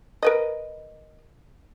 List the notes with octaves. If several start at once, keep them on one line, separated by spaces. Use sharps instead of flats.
A#4 B4 D#5